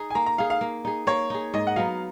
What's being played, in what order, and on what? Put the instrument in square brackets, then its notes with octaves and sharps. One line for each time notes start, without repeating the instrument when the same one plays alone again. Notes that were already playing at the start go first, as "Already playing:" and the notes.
Already playing: [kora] D#4 G#4
[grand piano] G#5
[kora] A#3 [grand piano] A#5
[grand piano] A#5
[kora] D#4 G#4 [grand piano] F5
[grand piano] F5
[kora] A#3
D#4 G#4
[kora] A#3 [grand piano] C#5
[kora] D#4 G#4
[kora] G#2 [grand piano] D#5
[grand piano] F#5
[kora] F#3 B3 D#4 [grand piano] F5